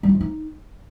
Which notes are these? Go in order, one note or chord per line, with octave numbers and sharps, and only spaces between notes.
G3
F4
F3
D#4